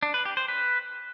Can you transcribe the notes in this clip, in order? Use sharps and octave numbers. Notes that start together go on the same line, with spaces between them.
D4
B4
G4
C5
B4